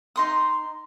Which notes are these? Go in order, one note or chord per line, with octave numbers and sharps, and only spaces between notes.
D#4 C6 D#6